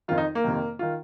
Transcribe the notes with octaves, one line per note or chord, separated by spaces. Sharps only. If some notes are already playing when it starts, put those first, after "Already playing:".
F2 D#3 F4
D#4
A#3
F2 C3 D#3
D#3 F4